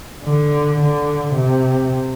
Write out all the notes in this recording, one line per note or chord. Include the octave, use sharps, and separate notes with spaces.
D3
D3
C3